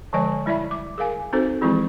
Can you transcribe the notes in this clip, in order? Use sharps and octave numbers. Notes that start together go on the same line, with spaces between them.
D3 F3 G#3 C#5 D#5 G#5
G3 E4 D5 E5 B5
D6
G#4 A#4 F5 G#5
C4 D#4 F#4 A4 C5
E3 F3 G#3 C4 E4 G#4